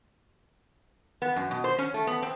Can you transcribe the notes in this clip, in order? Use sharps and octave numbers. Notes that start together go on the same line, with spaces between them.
B3
F#2
B2
C5
C#4
A3
B3
C4